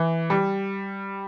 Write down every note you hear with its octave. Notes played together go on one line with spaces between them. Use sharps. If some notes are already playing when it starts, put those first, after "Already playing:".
Already playing: E3
G3